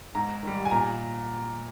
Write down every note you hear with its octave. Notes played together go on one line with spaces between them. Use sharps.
G#2 A#5
D#3 G3
G#5
A#2 A#5